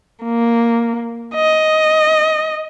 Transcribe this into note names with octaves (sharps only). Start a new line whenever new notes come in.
A#3
D#5